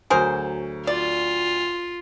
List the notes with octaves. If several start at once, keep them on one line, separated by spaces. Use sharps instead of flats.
D2 F#3 G#4 A#4 C5
F4 D5